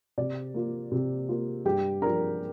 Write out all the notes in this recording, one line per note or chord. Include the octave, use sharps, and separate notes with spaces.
C3 D5
A#3 F4
C3
A#3 F4
G2 G4 G5
F3 D4 A#4 A#5